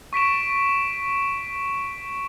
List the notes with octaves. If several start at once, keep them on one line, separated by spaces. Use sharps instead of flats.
C#6 B6 D7 E7